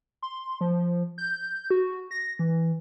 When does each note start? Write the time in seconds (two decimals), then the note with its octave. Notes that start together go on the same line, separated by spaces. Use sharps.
0.22 C6
0.61 F3
1.18 G6
1.70 F#4
2.11 A#6
2.39 E3